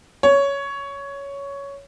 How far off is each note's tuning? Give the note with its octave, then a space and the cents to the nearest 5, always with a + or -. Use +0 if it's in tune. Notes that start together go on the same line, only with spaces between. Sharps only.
C#5 +10